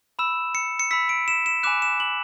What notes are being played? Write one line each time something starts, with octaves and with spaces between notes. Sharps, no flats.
B5 E6 E7
C#7
C#7
B5 E6 B6
D7
E7
E7
G#5 B5 D6 F#6 E7
E7
F#7